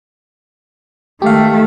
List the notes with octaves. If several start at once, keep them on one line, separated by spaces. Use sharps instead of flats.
D#3 A3 G4 F5